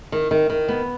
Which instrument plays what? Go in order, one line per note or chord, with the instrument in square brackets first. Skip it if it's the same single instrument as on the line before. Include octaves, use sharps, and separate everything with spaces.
[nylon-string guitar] D#3
D#3
D#3
B3